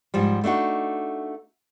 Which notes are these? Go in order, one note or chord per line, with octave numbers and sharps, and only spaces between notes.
G#2 F3 G3
A3 D4 D#4 F#4